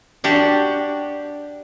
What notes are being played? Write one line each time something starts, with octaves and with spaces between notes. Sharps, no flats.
D4 F#4 G4